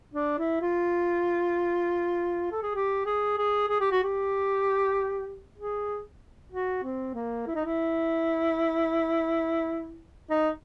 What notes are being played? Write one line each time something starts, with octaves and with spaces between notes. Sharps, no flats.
D4
E4
F4
A4
G#4
G4
G#4
G#4
G#4
G4
F#4
G4
G#4
F#4
C4
A#3
E4
D#4
E4
D#4